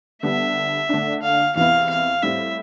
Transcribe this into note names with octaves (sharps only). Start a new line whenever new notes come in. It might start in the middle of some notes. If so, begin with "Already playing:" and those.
D3 G3 B3 E5
D3 A3 D4
F5
E2 C3 E3 B3 E4 F5
F5
A2 G3 C4 E4 E5